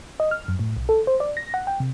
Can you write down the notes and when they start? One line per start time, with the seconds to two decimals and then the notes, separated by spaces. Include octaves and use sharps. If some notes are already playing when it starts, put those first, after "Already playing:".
0.20 D#5
0.31 F6
0.48 F#2
0.59 A2
0.77 B1
0.89 A4
1.07 C5
1.20 D5
1.37 A#6
1.54 F#5
1.67 G5
1.80 C3